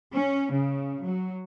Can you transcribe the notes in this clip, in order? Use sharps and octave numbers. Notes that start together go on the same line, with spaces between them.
C#4
C#3
F#3